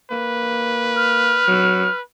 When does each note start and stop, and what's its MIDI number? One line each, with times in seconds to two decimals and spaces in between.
0.11 1.43 58
0.11 2.01 71
0.96 1.96 89
1.48 1.87 54